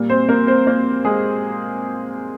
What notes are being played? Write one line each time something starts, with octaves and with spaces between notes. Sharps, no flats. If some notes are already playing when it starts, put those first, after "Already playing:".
Already playing: A#2 G3 A#3
C4 C5
A#3 A#4
C4 C5
A#3 A#4
G#3 G#4